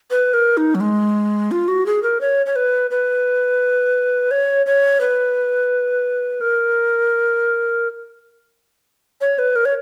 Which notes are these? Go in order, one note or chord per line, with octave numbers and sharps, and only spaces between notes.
B4
A#4
D#4
F#3
G#3
F4
F#4
G#4
A#4
C#5
C#5
B4
B4
C#5
C#5
B4
A#4
C#5
B4
A#4
C#5